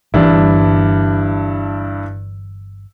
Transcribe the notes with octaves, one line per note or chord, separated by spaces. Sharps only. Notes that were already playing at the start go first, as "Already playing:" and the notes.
G1 G2 E3 D4 E4